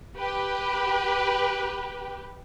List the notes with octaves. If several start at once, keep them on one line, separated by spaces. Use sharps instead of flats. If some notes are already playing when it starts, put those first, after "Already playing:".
G4 B4